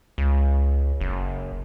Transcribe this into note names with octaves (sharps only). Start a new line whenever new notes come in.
C#2
F#1